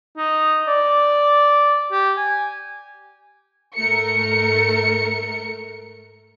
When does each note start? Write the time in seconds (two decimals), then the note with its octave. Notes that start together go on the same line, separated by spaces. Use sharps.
0.17 D#4
0.68 D5
1.92 G4
2.17 G#5
3.75 G#2 A3 A#4 C#7